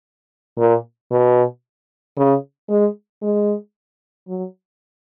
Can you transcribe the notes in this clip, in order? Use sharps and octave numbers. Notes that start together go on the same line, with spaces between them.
A#2
B2
C#3
G#3
G#3
F#3